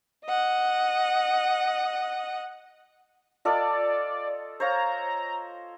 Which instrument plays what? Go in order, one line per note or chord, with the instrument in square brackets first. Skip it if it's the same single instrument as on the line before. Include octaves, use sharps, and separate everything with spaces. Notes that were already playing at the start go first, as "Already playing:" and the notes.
[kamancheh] D#5 F#5
[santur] F4 A4 D#5 [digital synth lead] D5
[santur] C5 C#5 F5 [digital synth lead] A#5